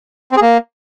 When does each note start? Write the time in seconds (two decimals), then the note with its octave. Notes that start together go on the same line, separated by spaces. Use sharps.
0.32 C4
0.37 G#4
0.42 A#3